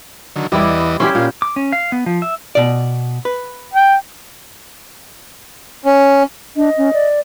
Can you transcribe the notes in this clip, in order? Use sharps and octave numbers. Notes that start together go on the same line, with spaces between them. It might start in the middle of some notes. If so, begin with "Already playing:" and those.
D3 D#3 F#3
E2 E3 G3 E4 D5 D#5
E3 C#4 E4 G4 B5 C6
A#2 F4
D6
C#4
F5
B3
F3
E5
B2 D5
B4
G5
C#4
D4 D#5
C#4
D5